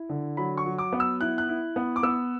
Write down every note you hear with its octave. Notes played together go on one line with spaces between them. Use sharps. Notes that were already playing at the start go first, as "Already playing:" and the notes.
Already playing: E4
D3
F#3 B5
C#6
F#3
D6
B3
E6
E4 F#6
F#6
E4
B3
D6
B3 E6